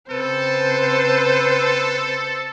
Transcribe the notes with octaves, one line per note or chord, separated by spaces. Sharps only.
C#3 C4 A4 B4 C5